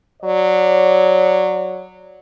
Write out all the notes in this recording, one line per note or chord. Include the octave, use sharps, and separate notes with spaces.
F#3 C#5 D5